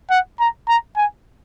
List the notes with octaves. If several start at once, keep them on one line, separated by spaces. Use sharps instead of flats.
F#5
A#5
A#5
G#5